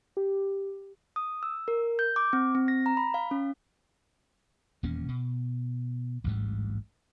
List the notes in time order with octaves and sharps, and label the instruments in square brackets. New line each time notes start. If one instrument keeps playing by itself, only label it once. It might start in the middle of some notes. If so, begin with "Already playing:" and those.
[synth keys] G4
[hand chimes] D#6
E6
A#4
G6
D6
C4
C4
A#6
A#5
B5
F5
C#4
[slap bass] D#1 E2 A#3 C#4
B2
A1 D2 G#2 G3